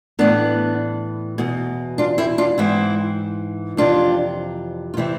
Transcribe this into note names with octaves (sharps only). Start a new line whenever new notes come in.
A2 E3 B3 D4
E2 B2
D4 F4
C4 E4
D4 F4
G#2 E3 C4 E4
F2 C3 E3 D4 F4
F4
C3 E3 C4 E4